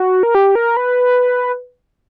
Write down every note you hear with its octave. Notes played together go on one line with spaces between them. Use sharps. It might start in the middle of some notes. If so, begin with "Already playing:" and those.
Already playing: F#4
A#4
G4
A#4
B4